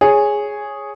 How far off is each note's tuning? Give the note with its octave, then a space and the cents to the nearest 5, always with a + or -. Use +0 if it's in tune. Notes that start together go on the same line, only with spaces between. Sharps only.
G#4 +0 C#5 +0